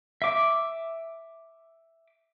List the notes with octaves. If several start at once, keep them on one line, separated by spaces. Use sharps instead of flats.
E5 D6